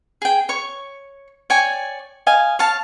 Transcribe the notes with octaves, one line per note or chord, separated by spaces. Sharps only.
G#4 G5
C#5 C#6
C#5 D5 G5 G#5
D#5 F5 G#5
C#5 F5 A5